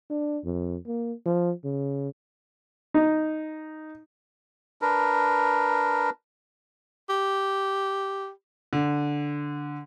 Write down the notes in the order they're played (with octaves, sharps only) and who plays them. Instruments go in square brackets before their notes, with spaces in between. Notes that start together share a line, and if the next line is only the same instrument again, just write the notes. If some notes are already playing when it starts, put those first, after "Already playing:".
[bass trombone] D4
F2
A#3
F3
C#3
[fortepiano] D#4
[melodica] D4 A#4 B4
[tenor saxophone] G4
[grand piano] D3